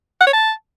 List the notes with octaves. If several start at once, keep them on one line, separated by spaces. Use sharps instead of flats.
F#5
C#5
A5